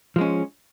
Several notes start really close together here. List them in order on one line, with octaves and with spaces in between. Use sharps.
F3 G#3 C#4